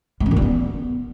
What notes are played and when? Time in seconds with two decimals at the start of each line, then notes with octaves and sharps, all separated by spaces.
0.20 G#3
0.26 C#4
0.31 D#3
0.37 G3
0.42 B3